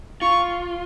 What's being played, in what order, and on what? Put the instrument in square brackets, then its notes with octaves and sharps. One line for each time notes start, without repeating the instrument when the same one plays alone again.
[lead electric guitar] F4 [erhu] C#6